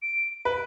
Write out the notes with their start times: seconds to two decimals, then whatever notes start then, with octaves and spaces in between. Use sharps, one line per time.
0.02 D7
0.45 B4